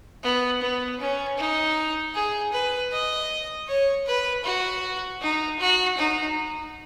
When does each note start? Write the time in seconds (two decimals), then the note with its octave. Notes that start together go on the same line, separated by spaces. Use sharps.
0.23 B3
0.61 B3
1.00 C#4
1.38 D#4
2.15 G#4
2.53 B4
2.92 D#5
3.68 C#5
4.06 B4
4.45 F#4
5.21 D#4
5.60 F#4
5.98 D#4